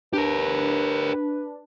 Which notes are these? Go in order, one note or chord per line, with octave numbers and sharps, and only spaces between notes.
D4 G4 A#4 B4